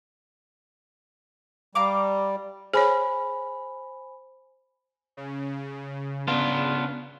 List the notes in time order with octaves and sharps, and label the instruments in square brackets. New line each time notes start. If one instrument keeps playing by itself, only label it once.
[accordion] G3 [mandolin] F5 A#5 D6
[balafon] G#4 C#5 [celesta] C5 G#5 B5
[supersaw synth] C#3
[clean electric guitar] B3 D4 F4